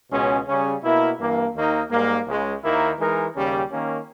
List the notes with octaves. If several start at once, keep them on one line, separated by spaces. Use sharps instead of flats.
C#2 B2 G#3 C#4
C#3 G3 C#4 G#4
B2 A#3 E4 A#4
G2 E3 A#3
D#2 D#3 A#3 D#4
G#2 G3 A#3
C#2 C#3 G#3
D#2 D#3 A#3 E4 A#4
E3 G#3 D#4 A#4
D#2 C#3 G3 C#4 G4
D#3 A#3 C#4